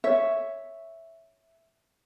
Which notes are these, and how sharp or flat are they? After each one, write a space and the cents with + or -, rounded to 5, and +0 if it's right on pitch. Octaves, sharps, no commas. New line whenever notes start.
C#5 +0 E5 +0